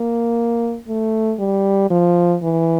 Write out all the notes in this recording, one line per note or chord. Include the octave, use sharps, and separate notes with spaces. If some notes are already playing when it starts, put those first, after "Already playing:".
Already playing: A#3
A3
G3
F3
E3